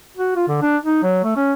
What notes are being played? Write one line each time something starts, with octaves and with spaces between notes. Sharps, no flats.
F#4
F4
D3
D4
D#4
F#3
A3
C#4